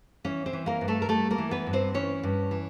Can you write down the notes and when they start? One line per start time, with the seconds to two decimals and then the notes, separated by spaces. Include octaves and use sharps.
0.24 E3 C#4 C#5
0.46 C4 C5
0.53 E3
0.66 A#3 A#4
0.81 G2
0.88 A3 A4
1.02 A#4
1.09 G3 A3 A4
1.31 A#3 A#4
1.38 E3
1.51 B3 B4
1.67 G2
1.73 C4 C5
1.94 E3 C#4 C#5
2.23 G2
2.51 E3